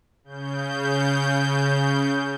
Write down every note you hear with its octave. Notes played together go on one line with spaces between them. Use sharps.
C#3 G6